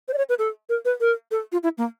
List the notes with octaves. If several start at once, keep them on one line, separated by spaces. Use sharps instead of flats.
C5
D5
C#5
B4
A4
A#4
B4
A#4
A4
F4
E4
A#3